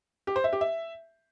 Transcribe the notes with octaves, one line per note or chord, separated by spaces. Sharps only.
G4
C5
E5
G4
E5